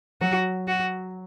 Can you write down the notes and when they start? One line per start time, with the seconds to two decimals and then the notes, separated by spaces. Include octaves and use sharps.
0.21 F#3 F#4
0.68 F#4